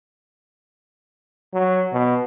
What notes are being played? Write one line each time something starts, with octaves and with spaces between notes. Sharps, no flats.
F#3
B2